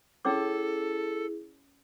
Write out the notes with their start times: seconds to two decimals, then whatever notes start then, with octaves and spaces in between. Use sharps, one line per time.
0.25 C#4 E4 G#4 A4 C#5 D6